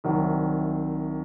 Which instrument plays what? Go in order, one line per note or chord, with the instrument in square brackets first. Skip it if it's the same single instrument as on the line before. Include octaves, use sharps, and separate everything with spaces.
[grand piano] C2 C3 D#3 F#3